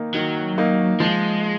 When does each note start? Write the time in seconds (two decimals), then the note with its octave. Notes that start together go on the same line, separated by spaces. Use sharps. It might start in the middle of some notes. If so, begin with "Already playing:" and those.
Already playing: D#3 A#3 D#4
0.14 D#3 F#3
0.58 A#3 D#4
1.00 F3 G#3